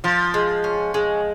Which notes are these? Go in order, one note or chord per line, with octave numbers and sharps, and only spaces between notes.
F3 F4
G#3
C#4
G#3